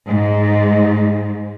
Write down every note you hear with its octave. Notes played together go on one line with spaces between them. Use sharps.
G#2